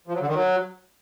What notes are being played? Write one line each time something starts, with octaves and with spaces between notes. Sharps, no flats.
F3
F#3
D3
D#3
F#3